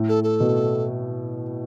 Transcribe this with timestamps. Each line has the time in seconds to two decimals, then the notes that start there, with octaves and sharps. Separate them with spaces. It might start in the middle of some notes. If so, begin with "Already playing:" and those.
Already playing: A2
0.09 A4
0.24 A4
0.40 B2